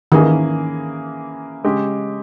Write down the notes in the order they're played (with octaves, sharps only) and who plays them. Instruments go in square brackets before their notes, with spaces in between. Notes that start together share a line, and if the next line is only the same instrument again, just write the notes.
[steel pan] D#3 [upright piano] E3 A#3 C#4 G#4
[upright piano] C#3 G#3 C#4 G4